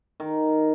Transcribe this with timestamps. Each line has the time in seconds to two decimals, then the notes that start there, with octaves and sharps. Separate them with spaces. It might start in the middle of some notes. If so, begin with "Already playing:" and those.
0.20 D#3